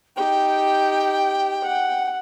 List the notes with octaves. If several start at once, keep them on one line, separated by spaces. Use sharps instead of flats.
D#4 G4 G5
F#5